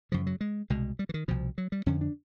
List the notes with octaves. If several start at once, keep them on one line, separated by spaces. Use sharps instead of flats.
F#2 C#3 F3
F#3
G#3
C2 B2 G#3
G3
E3
D#3
C2 B2 F3
F#3
G3
F2 D3 C#4
D4